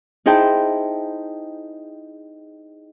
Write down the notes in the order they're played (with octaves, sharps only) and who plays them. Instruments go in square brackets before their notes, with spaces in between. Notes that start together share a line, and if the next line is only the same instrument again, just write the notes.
[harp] D#4 E4 G#4 C5 G5 A5